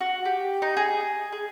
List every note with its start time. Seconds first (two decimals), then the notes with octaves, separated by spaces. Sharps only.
0.01 F#4
0.25 G4
0.62 D#4
0.77 G#4
1.32 G#4